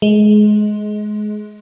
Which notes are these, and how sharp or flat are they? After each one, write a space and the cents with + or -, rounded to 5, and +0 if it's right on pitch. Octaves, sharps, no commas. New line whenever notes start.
G#3 +20